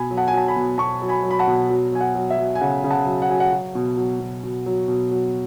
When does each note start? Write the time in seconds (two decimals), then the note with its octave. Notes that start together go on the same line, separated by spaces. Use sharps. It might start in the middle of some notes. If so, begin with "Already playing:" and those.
Already playing: B2 G#5 B5
0.11 F#3
0.17 F#5 A5
0.28 G#5
0.33 F#3 A5
0.48 G#5 B5
0.56 B2
0.78 B2 A5 C#6
1.02 F#3
1.08 G#5 B5
1.23 F#3
1.31 B5
1.39 F#5 A5
1.47 B2
1.70 F#3
1.92 F#3 G#5
2.01 F#5
2.15 F#3
2.30 E5
2.38 F#3
2.55 G#5
2.61 C#3 F#5
2.84 C#3
2.91 F#5 A5
3.06 F#3
3.22 F#5
3.29 F#3 G#5
3.40 F#5
3.52 F#3
3.75 B2
3.97 F#3
4.20 B2
4.44 B2
4.66 F#3
4.88 B2
5.11 F#3